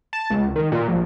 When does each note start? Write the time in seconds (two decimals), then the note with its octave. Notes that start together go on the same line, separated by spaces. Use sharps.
0.13 A5
0.30 C#2
0.56 D#3
0.72 A#2
0.88 A#1